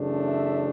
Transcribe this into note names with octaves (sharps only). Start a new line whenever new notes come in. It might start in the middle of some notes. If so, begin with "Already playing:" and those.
Already playing: F#2 C#3 E3 A3 D4
E5